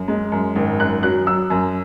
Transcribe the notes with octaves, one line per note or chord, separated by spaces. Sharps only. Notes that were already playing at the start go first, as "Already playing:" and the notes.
Already playing: F#2
G#3
F#2
G#1
F#2 F#6
F#3 F#6
F#3 E6
F#2